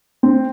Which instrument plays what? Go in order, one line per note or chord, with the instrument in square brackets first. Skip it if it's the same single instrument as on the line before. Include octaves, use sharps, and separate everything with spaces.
[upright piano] C4